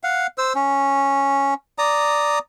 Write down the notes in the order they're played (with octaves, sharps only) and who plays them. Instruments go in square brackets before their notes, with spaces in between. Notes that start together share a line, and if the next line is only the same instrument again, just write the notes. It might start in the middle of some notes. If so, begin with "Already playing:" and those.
[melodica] F5 F#5
C5 E6
C#4
D5 A#5 D#6